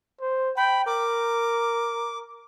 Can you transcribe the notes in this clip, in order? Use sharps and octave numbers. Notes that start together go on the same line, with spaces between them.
C5
G5 B5
A#4 D6